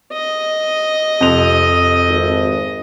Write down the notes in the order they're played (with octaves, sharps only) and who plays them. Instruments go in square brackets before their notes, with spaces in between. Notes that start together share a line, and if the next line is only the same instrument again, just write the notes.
[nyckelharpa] D#5
[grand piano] F2 F7 [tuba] C3
[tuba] G#1